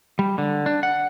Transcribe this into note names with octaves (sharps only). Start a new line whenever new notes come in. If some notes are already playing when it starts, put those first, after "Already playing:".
G3
D3
D4
F#5